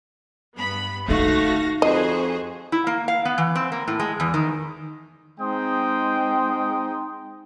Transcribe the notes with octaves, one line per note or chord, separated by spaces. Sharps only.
G2 B3 B5
D3 A3 D#4 F#4 F5 A#6
F2 F#4 G#4 C5 D#5
E4
A#3
F5
B3
E3
C4
A#3
A2
G#3
E2
D#3
G#3 C4 D#4 G5 C6 D#6